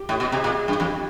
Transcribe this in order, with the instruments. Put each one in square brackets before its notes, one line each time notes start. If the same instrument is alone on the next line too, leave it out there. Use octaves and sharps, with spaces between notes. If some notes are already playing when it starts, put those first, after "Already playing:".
Already playing: [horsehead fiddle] G4
[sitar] A2
B2
[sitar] C3 [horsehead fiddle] G#4
[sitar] A#2
G2
[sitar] F2 [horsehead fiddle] G4